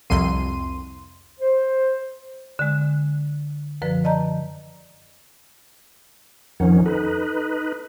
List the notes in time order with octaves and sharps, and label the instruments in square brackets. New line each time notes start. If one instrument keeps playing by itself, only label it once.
[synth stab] C2 F2 C6 D#7
[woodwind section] C5
[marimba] D3 G#3
F#2 D3 F3 B4
D5 D#5 A5 A#5 G6
[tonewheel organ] F2 D#3 C#4 [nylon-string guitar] F3 D#4 F#5
[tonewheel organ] D#4 B4 [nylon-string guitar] A4